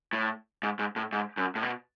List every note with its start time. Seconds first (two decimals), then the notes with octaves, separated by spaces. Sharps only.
0.13 A2
0.63 G#2
0.79 G#2
0.96 A2
1.12 G#2
1.37 F#2
1.56 A2
1.63 B2